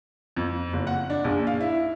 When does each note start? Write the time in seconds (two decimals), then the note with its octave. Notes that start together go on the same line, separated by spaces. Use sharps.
0.36 F2
0.73 F#1
0.87 F#5
1.10 D4
1.24 A#1
1.47 F5
1.61 E4